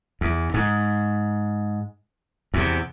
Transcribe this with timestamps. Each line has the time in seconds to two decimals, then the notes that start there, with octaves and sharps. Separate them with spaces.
0.21 E2
0.54 G#2
2.54 E2 C3